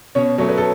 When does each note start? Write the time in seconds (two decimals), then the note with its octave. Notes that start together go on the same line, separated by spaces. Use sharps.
0.15 B2 C#4 C#5
0.38 F#3 A3 C#5
0.49 B4
0.58 A4